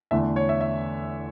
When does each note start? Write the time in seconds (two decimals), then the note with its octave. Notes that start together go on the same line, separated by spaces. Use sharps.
0.11 E2 D3 A3 E5
0.36 C#5
0.49 E5
0.61 E5